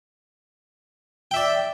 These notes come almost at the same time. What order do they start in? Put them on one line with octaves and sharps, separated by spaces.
G5 E5 D5